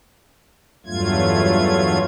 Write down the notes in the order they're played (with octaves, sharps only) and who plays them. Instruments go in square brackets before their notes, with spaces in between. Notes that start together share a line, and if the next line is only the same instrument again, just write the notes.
[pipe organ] E2 G2 F#3 A3 F4 G#6